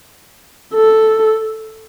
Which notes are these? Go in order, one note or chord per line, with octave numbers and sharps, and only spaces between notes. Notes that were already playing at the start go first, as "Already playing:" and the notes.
A4